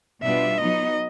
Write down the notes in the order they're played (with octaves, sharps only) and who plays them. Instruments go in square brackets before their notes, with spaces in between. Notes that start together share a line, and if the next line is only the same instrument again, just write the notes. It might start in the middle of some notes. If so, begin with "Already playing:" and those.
[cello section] B2 G3 B3 D4 F4 [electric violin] E5
[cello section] F#3 B3 D#4 [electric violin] D#5